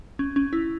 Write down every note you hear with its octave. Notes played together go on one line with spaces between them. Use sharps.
C#4
C#4
E4